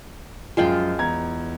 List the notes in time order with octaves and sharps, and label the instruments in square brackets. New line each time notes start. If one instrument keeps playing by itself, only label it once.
[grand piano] F#2 F3 [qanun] G#3 F4 G5
[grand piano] E2 A#5 G#6